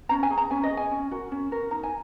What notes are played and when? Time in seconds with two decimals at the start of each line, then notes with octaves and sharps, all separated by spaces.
0.09 C#4 A#5
0.23 G#5
0.30 G#4
0.37 A#5
0.51 C#4 G#5
0.64 D#5
0.70 G#4
0.77 G#5
0.91 C#4
1.11 F#4 A#4
1.32 C#4
1.51 F#4 A#4
1.71 D#4 A#5
1.83 G#5